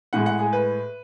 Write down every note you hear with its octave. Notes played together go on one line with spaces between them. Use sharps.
A2 G#3 F#5
F#5
G#4
B4